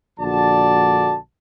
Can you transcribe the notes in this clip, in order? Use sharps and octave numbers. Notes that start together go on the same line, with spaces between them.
A#1 D3 F#4 D5 A5